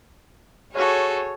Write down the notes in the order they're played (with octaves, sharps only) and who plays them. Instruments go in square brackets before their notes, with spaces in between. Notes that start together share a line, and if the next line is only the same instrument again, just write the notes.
[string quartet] F#4 G#4 A4 [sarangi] C#5